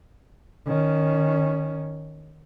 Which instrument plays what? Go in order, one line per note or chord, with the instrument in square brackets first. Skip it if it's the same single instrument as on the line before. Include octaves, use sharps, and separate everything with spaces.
[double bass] D#3 C#4